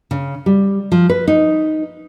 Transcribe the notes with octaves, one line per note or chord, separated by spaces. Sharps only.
C#3
G3
F3
B4
D#4